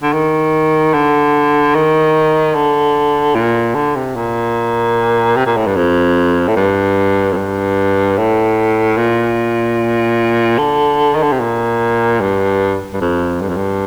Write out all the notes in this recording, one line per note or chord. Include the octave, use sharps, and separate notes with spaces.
D3
D#3
D3
D#3
D3
A#2
D3
C3
A#2
C3
A#2
A2
G2
F2
A2
G2
F2
G2
A2
A#2
D3
D#3
D3
C3
A#2
G2
G2
F2
G2
F2
G2